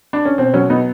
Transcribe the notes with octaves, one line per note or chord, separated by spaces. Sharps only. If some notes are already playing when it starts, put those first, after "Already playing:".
D4
C#4
B2 C4
F#3 C#4
B3 D#4